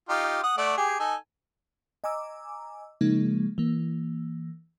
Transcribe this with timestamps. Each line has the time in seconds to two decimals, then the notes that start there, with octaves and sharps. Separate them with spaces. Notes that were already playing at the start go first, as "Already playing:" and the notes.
0.09 D#4 F4 G4
0.43 F#5 D#6
0.58 A3 D5 F#5
0.77 G4 G#4
0.99 D#4 A4 G#5
2.04 D#5 G#5 A#5 D6 E6
3.01 C#3 F3 G#3 A#3 D#4
3.58 E3 A#3